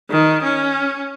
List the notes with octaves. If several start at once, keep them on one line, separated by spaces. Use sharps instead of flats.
D#3
C#4